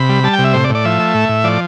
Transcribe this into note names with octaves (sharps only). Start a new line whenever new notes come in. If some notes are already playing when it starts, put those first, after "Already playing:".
Already playing: C3 B5
G3
G3 A5
G5
C3
E5
A2 C5
D5
A2
D5
F3 E5
A3
A2
A2
F3 D5